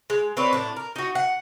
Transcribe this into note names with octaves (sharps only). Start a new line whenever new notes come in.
G#3
C4 B4 C#5 D5
A2 D4
A#4
D#4 F#4
F#5